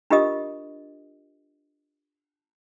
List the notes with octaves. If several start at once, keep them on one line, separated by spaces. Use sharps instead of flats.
D4 F4 G4 A#4 D#5 D#6